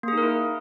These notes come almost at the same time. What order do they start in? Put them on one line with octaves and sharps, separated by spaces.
A#3 G#4 D#4 A#4 E4